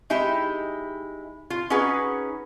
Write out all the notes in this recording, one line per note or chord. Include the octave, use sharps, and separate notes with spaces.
G#3 D#4 E4 G4
F4
C#4 D#4 F#4 G#4 B4